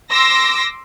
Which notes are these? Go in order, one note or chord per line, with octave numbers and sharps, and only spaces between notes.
C6 D6 E6 A#6